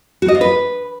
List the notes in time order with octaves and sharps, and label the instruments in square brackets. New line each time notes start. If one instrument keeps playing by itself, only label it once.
[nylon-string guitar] F#4
D#5
F4
B4